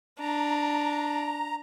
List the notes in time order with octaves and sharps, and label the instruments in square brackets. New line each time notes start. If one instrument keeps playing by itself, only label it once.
[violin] D4 [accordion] A#5